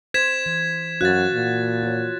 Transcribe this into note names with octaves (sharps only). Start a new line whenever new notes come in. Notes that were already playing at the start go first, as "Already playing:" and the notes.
C5 G#6 B6 E7
E3
F#2 F#4 F5 F#6 A6
A#2
F4 C#5